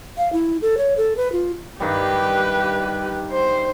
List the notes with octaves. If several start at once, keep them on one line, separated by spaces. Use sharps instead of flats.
F5
E4
A4
C#5
A4
B4
F4
G2 D#3 G3 G4 B4
C5